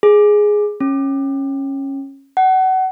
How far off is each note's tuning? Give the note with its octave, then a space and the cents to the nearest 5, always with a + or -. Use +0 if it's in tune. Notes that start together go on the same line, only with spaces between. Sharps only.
G#4 +5
C#4 -20
F#5 +25